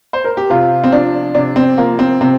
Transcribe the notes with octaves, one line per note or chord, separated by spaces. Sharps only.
C5
A#4
G4
C3 F4
C4
F3 D4
C3 D4
C4
F3 A#3
C4
C3 C4